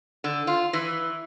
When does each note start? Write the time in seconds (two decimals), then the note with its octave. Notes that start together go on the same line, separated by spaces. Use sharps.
0.24 D3
0.47 F4
0.73 E3